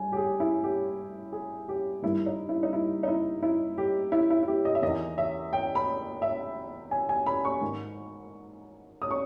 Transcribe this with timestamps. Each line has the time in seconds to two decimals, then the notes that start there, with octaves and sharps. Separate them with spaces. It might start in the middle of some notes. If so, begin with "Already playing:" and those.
Already playing: G2 G#5
0.12 G4
0.17 G#4
0.40 E4
0.63 G4
1.33 G#4
1.68 G4
2.02 G2 D#3 E4
2.26 D#4
2.49 E4
2.63 D#4
2.73 E4
3.03 D#4
3.08 E4
3.43 E4
3.78 G4
4.12 E4
4.30 E4
4.43 E4
4.48 G4
4.65 D#5
4.75 E5
4.82 E2 D#3 D#5
5.18 E5
5.53 G5
5.75 B5
6.22 E5
6.91 G#5
7.09 G#5
7.26 B5
7.45 C#6
7.61 G#2 D#3
9.02 D#6
9.11 C#6